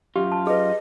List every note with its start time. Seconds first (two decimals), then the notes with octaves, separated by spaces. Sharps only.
0.16 F#2 F4 G4
0.32 A5
0.47 G#4 B4 D#5